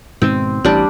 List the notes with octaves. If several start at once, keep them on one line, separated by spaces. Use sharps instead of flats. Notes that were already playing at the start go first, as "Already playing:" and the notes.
G#2 B2 D#3 C4
A1 G3 D4